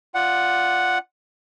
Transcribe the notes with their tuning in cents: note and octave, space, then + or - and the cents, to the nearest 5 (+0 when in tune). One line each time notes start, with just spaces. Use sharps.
F4 +0 D5 +0 F#5 +0